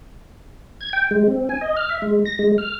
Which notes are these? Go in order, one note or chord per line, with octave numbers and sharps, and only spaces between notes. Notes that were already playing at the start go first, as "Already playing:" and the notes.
G#6
G5
G#3
C4
G#5
D#5
F6
E5
G#3
A#6
G#3
F6